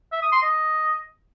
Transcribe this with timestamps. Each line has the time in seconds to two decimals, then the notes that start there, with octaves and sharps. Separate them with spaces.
0.12 E5
0.22 D#6
0.32 C6
0.42 D#5